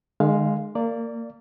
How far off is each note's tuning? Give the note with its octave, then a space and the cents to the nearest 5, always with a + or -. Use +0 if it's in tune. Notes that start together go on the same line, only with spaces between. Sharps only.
D#3 -45 G#3 +0 F5 +0
A#3 -20 D5 +0